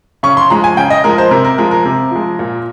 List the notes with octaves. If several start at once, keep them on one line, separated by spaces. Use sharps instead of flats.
C#3 C#6
C6
F3 G#3 A#5
G#5
C#3 G5
D#5
F3 G#3 A#4
C5
C3 A#4
A#4
F3 G#3 A#4
A#4
C3
F3 G#3
A#2